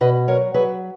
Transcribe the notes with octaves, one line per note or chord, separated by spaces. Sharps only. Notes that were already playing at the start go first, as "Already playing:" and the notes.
B2 B4 D#5
F#3 A#4 C#5
F#3 G#4 B4